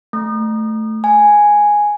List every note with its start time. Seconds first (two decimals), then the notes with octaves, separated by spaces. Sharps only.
0.13 A3
1.04 G#5